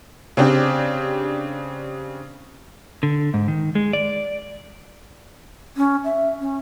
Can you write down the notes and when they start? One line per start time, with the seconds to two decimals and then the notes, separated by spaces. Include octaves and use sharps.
0.37 C#3 C4 D4 G4
3.03 D3
3.34 G#2
3.48 D#3
3.75 G#3
3.93 D5
5.77 C#4
6.05 E5
6.40 C#4